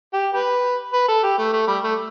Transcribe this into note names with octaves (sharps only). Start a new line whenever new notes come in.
G4
G4 B4
B4
A4
G4
A3
A3
G3
A3